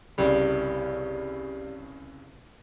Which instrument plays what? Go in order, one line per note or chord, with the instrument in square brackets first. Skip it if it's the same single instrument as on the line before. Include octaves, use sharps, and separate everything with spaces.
[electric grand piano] C2 G2 C#3 [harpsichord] G3